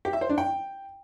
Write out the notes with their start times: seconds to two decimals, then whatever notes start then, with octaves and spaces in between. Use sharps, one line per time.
0.05 G4
0.13 E5
0.21 C5
0.29 D4
0.38 G5